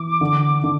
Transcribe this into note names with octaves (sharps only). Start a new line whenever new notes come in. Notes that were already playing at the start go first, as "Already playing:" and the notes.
Already playing: E3 D6
D3
D3